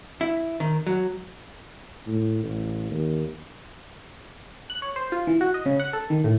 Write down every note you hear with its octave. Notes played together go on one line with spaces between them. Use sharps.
E4
D#3
F#3
A2
A1
D#2
F#6
C#5
C5
F4
E3
F#4
D#5
C#3
F#5
A4
D#3
A2